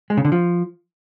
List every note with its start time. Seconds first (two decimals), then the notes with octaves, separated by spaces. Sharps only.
0.10 G#3
0.17 C#3
0.25 D3
0.32 F3